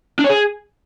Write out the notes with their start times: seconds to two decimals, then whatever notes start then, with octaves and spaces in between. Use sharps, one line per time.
0.19 D4
0.24 C#5
0.29 G#4